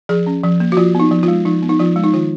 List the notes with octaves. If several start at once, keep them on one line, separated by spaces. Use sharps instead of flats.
F3 G#4
C#4
F3
A#3
F#4
F3 F4
B3 D#4
F3
F4
G#3
F3 D#4
B3
D#4
F3 F4
G#3
D#4
D#3 F4